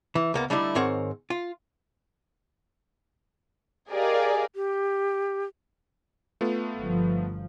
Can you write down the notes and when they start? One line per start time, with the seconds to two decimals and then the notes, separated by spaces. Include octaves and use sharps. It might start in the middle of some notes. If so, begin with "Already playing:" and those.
0.15 E3
0.34 C#2 A#3 B3
0.50 D3 G3 A3 D#4 E4
0.75 G#2 D#3 C4 A#4 C#5 F#5
1.30 F4
3.90 G4 G#4 A#4 D5 D#5 F5
4.54 G4
6.41 A3 B3 F4
6.77 G1 F3